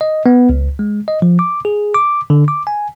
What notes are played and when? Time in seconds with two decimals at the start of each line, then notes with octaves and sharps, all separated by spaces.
0.01 D#5
0.26 B3
0.49 C#2
0.79 G#3
1.08 D#5
1.22 F3
1.39 D6
1.65 G#4
1.95 D6
2.30 D3
2.48 D6
2.67 G#5